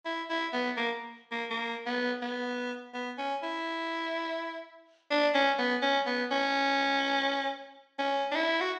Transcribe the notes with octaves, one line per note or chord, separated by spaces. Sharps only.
E4
E4
B3
A#3
A#3
A#3
B3
B3
B3
C#4
E4
D4
C#4
B3
C#4
B3
C#4
C#4
D4
E4
F#4